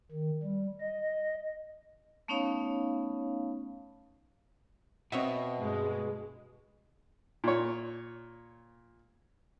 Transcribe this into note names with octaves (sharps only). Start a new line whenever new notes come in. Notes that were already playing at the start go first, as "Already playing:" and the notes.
D#3
G3
D#5
A3 B3 C#4 D#4 C#5 F5
B2 C4 F#4 C#5 D#5 E5
G2 G#3
A#2 C#5